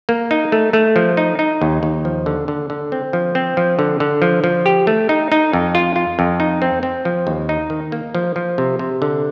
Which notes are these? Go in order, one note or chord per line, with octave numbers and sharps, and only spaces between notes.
A#3
D#4
A3
A3
F3
D#4
D#4
D#2
D#2
F3
D3
D3
D3
C4
F3
C4
F3
D3
D3
F3
F3
G4
A3
D#4
D#4
F2
F4
F4
F2
D#4
C4
C4
F3
D#2
D#4
D#3
A#3
F3
F3
C3
C3
D3